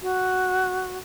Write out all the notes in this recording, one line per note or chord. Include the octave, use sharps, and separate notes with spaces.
F#4